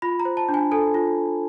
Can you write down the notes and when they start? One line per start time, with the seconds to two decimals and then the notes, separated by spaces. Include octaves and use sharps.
0.02 F4 B5
0.20 A#5
0.25 C5
0.37 A5
0.49 D4
0.54 G#5
0.72 A4 G#5
0.94 F4